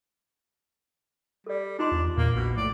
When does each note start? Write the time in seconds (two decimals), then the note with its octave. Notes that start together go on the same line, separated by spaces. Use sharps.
1.46 G3 A4 D5
1.79 D4 D#4 F4 G5 C6
1.92 E2
2.17 E2 A#2 A#3
2.35 A#1 B2
2.57 A2 D5